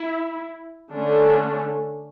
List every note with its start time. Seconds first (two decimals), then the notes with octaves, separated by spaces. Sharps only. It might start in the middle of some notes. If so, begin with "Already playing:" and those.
Already playing: E4
0.93 D3 A3 C#4 D4